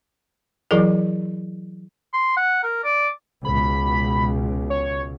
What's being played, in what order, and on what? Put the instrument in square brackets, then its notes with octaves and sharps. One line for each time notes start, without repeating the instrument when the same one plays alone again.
[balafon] E3 F#3 E4 G#4 A#4
[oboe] C6
F#5
A#4
D5
[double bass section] C#2 B2 [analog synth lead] B5
[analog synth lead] C#5